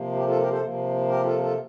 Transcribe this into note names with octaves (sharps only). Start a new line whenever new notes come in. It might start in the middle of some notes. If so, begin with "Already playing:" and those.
Already playing: C3 F3 A#3
G4
F4 A4
G4 A#4
A4 C5
C3 F3 A#3
G4 A#4
F4 A4
F4 A4